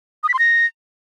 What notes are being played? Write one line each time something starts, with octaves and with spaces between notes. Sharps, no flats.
D#6
B6
C6
A#6